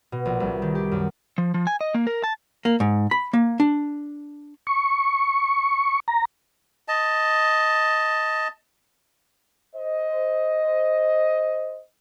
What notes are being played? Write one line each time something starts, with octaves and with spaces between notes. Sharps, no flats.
B2
A#1
C2
D#3
G4
F#2
F3
F3
G#5
D#5
A#3
A#4
A5
A#3
G#2
B5
A#3
D4
C#6
A#5
D#5 A5
C5 D#5